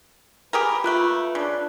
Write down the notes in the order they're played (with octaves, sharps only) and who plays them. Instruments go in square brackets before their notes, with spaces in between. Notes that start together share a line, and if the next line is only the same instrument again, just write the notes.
[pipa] G4 G#4 A#4 [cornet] B4
[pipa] A3 A#3 [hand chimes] F4 F#6
[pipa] C#3 [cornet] D4